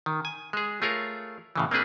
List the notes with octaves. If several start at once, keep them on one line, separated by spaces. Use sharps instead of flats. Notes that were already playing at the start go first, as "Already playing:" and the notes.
D#3
G#5
G#3 G#4
A3 F4 G#4 A#4 C#5
A2 C#3 E3
A#3 C4 D4 G#4 B4